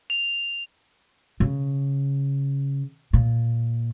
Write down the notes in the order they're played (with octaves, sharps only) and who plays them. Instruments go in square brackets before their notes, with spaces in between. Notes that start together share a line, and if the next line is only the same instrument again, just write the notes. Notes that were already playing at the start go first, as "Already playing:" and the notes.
[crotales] F7
[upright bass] C#3
A#2